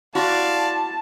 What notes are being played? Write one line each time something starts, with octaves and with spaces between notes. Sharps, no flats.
E4 F#4 D5 F5 A5 B5 C6